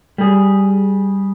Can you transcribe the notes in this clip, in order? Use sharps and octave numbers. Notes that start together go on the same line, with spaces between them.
G3 G#4